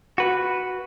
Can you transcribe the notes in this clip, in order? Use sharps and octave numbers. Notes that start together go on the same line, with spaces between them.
F#4 B4